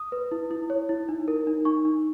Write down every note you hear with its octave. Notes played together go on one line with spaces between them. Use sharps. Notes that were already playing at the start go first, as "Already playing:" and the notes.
Already playing: D#6
B4
E4
E4
C#5
E4
D#4
A#4
D#4
D#4 C#6
D#4